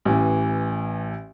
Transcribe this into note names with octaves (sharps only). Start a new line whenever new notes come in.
A1 E3